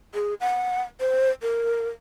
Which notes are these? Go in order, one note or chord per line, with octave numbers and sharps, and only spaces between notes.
G#4
F#5
C5
A#4